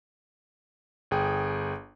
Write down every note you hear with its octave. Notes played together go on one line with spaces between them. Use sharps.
G1 G#4 G5